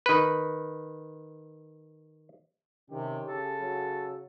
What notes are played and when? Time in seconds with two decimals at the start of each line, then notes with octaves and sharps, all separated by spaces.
0.06 D#3 B4
2.90 C3 D#3 C#4 G4
3.28 C#3 A4
3.61 F#3